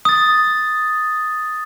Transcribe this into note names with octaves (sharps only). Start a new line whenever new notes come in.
D#6 A6